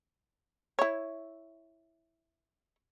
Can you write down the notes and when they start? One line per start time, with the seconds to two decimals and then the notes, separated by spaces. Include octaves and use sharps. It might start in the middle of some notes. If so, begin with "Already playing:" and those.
0.79 E4 C#5